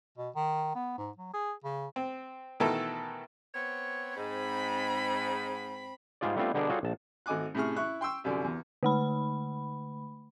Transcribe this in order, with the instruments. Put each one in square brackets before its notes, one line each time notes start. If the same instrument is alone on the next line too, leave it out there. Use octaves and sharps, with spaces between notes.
[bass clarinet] B2
D#3
B3
G#2
F#3
G#4
C#3
[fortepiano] C4
B2 D#3 E3 A3 A4
[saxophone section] B3 C4 C#5
[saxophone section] G#2 [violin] C4 B5
[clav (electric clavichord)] G#2 G3 G#3 F4 G#4 D5
G3 A3 B3 C4 D4 F4
B2 D3 G3 D4 G#4 A#4
G3 F4 F#4 G#4 A4 C#5
A#1 A5
[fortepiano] G#1 A3 D#5 G#5 D6 F#6
A2 C3 G#4 C#6 F6
E4 C#6 F#6
G5 C6 C#6 E6
C2 F#2 D3 D5
E2
[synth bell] D3 A3 B5